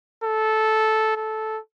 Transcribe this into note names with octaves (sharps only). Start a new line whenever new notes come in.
A4
A4